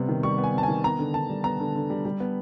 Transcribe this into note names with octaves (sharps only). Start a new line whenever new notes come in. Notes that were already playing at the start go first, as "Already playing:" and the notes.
Already playing: C3 G3 B3
D#3
G3 C#6
B3
G#5
C3 A5
G#5
D#3
B3 A#5
D3
D3 A5
G3
B3 A#5
D3
D3
G3
G3
B3